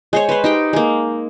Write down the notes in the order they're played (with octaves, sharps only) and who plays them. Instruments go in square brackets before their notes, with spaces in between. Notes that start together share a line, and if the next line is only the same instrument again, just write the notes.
[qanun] G#3 C5 C#5
B4 C5
D#4 G4 G5
G#3 A#3